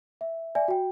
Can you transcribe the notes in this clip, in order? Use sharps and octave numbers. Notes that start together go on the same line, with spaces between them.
E5
D5 E5 G#5
F#4 G5